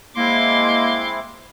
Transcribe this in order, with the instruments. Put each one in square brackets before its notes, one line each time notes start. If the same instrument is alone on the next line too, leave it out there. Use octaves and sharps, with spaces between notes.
[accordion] G#3 C4 E4 [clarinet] A#3 [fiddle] C6 D6